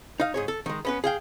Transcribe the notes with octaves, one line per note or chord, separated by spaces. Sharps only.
D#4 F5
G#2 G#4 C#5
A4
D#3 G#3
B3 C#4 B4
G#4 F5 G5